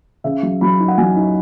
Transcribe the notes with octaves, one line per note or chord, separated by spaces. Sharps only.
C#3 E5
F#3
F#3 B5
D#4
F#5
F#3 G#5
D#4